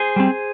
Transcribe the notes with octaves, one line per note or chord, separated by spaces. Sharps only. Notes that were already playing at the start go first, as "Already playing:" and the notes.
Already playing: G#4 C5
G3 C4